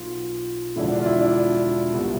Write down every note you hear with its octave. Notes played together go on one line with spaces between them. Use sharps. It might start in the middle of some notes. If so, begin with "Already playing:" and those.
Already playing: B1 B2 F4
E1 E2 D3 F3 E4
D4
F4
E4
D4
C2 B2